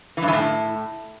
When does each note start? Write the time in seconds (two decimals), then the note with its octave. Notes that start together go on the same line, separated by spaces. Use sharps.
0.17 E3
0.22 G2
0.28 E3
0.33 A2